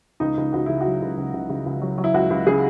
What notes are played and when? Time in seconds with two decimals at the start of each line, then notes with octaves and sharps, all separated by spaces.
0.20 C#2 D#4
0.37 C#2
0.53 C#2 F#4
0.66 C#3 E4
0.81 F#3 F#4
1.02 C#2
1.17 C#2
1.33 C#2
1.49 C#3
1.66 C#2
1.82 F#3
1.98 F#3
2.04 E4
2.14 C#2 F#4
2.30 C#2
2.46 C#3 G#4